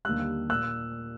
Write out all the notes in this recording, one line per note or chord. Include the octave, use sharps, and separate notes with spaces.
D#2 D3 G3 E6 F#6
A#2 E6 F#6